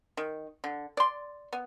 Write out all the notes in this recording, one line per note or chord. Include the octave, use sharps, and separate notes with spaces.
D#3
D3
D5 C6
B3